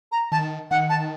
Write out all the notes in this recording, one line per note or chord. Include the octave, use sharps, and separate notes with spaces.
A#5
D#3 A5
D#3 F#5
A5